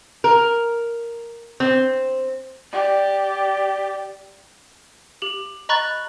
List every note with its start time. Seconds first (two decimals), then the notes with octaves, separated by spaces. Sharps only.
0.24 A#4
1.60 C4
2.73 G4 D5
5.22 G4 F#7
5.69 D#5 A#5 B5 C#6 F#6 A6